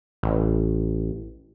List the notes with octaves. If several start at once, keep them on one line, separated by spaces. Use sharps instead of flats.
A1